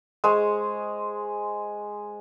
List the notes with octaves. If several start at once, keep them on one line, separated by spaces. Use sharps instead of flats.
G#3 G#4 C5 C#6